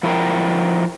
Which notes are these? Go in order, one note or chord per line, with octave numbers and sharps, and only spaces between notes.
F3 E4 F#4 G#4 A#4 G5